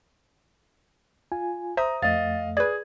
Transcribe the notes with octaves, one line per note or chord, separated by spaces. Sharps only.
F4 G#5
C5 E5 A#5 D#6
F2 A3 D#5 F5 A6
G#4 B4 D5 G#6